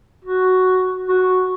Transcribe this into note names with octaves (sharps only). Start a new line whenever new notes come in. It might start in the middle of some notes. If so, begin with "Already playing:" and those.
F#4
F#4